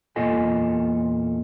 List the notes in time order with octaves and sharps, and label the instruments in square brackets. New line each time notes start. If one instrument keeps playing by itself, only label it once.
[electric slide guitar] E2 A#2 F4 A4 D#5 G#5